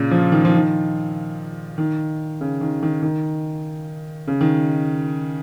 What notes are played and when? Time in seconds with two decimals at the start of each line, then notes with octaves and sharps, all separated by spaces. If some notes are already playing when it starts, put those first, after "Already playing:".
Already playing: A#2 C#3
0.11 F3
0.32 D#3
0.45 F3
0.57 D#3
1.78 D#3
2.41 C#3
2.61 D#3
2.83 D#3
3.03 D#3
4.28 C#3
4.41 D#3